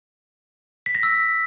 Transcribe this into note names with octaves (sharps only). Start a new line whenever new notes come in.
B6
A#6
E6